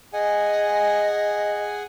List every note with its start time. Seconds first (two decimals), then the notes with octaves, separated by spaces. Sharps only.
0.13 G#4 D#5 F#5 G#5